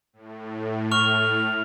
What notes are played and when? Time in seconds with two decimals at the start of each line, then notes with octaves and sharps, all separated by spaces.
0.13 A2
0.91 C#6 F6 F7